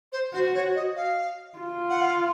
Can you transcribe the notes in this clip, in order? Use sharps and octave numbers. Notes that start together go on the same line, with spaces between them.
C5
F#4 C5
C#5
D#5
F5
F4
F#5
F5